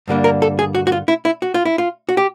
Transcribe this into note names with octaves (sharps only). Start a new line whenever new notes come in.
G2 D3 G3 A#3 D4
A#4
A4
G#4
F#4
F#4
F4
E4
E4
F#4
F4
E4
F4
F#4
G4